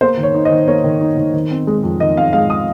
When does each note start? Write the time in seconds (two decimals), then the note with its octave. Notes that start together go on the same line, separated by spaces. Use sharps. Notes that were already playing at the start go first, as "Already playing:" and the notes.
0.01 A#3 C5
0.17 D#3
0.23 C#5
0.34 D#4
0.45 D#5
0.50 D#3
0.67 A#3 C#5
0.84 D#3
1.01 D#4
1.17 D#3
1.33 D#3
1.51 C4
1.67 G#3
1.84 F2
2.00 D#3 D#5
2.16 C4 F5
2.33 G#3 F5
2.50 D#6